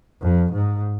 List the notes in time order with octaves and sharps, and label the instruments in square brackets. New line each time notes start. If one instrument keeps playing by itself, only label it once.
[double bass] F2
G#2